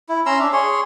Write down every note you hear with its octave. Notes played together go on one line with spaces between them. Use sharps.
E4
C#4 A#5 C6 E6
D4 E5
G#4 C#5 C6